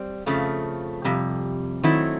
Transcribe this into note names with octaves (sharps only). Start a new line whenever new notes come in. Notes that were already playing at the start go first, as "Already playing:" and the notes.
Already playing: G3 C4
F2 C#3 F3 A3
F2 C3 G3
D#3 F#3 A3 C4 E4